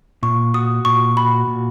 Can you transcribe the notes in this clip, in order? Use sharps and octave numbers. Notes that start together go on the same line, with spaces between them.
A#2 C#6
F#4 D#6
A#2 C#6
F#4 B5
A#2